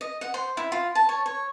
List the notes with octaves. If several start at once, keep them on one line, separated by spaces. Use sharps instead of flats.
D#5
F#5
C5
E4
F4
A5
C#5
C#5